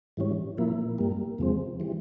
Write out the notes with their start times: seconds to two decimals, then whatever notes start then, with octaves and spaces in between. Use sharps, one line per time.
0.17 G#2 E3 G3 C#4
0.58 A#2 F3 A#3 E4
0.98 G2 G3 A#3
1.38 E2 C3 F3 G#3 C4
1.80 E3 G3